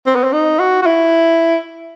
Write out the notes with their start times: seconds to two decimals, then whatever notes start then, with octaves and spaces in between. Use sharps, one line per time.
0.06 C4
0.16 B3
0.24 C4
0.33 D#4
0.60 F#4
0.82 F#4
0.86 E4